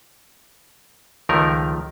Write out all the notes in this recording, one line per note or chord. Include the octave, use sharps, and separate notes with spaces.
C#2 D#3 F3 A3 A#4